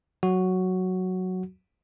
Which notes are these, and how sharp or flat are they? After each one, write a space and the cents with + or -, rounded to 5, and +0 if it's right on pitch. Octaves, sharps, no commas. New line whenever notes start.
F#3 +0 F#4 +0